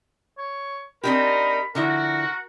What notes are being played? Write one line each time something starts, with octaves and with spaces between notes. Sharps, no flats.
C#5
C4 D4 D#4 G4 A#4 B5
D3 F3 E4 F#4 A#4